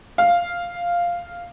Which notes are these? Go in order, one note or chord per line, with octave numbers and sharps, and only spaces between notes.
F5